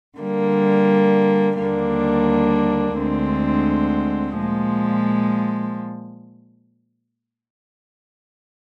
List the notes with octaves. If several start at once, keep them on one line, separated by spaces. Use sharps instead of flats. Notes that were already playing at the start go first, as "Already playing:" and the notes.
D3 G3 A#3
D#2 D3 G3 A#3 D4
D2 D3 G#3 C4
A#2 F3 G#3